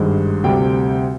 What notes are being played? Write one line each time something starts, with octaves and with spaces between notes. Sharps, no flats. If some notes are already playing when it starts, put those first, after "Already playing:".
Already playing: G#1 G2 D#3 G#3
D2 C3 G3 G5